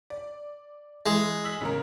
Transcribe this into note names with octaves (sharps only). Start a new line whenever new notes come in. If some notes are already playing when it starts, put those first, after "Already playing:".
D5
E3 G#3
E6 B6 F#7
A1 C#3 A#4